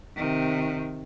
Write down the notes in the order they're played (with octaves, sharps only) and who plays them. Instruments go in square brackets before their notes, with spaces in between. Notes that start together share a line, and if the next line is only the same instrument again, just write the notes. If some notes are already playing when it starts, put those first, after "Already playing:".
[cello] C3 D#3